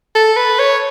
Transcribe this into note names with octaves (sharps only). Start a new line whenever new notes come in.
A4
B4
C#5